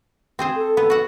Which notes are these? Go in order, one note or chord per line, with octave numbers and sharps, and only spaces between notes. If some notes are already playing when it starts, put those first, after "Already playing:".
C4 G#4 C5
A4
B3
F#4 F#5